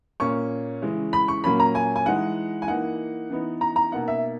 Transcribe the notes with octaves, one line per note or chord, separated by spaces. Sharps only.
A#2 A#3 C#4 C#6
C#3 E3 G#3
B5
C#6
A#2 F#3 A#3 C#4 B5
A#5
G#5
G#5
E3 G#3 D#4 F#5
G#5
E3 A#3 D#4 F#5
E3 B3 D#4
A#5
A#5
B2 A#3 D#4 F#5
E5